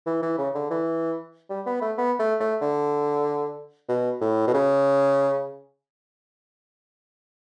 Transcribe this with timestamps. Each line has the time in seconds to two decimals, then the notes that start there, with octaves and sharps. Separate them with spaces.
0.06 E3
0.22 E3
0.38 C#3
0.55 D3
0.71 E3
1.50 G3
1.66 B3
1.81 A3
1.98 B3
2.19 A3
2.40 A3
2.61 D3
3.89 B2
4.21 A2
4.47 B2
4.54 C#3